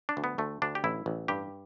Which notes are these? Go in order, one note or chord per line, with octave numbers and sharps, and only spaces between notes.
D4
D2
B3
D2 A3
D2 D4
G4
A1 E4
A1
G2 G4